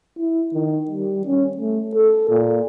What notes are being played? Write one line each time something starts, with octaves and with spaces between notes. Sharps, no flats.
E4
D#3
G3
C#4
A3
A4
A#2